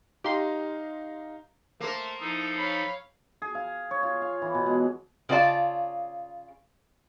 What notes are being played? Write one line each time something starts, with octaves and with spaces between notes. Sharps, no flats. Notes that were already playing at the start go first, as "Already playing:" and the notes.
D#4 G4 F5 A#5 C6
A3 A#3 A#4 C5
F3 D#4 E4 A4 A#5 D#6
C#5 F5 B5
G#4
F5
C#5
F4
F5
E3
B2
G#3
C#3 C4 F4 D5 A5